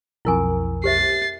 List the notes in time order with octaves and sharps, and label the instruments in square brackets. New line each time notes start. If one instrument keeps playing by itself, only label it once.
[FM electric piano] B1 F2 [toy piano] E4 A#4 G#5
[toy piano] G4 C5 E5 [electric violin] A6 C7